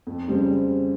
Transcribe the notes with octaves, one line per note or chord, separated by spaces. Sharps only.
F2
C#3 G3 C4